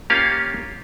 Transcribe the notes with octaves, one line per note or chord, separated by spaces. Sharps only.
A#3 C#4 F4 G4 F5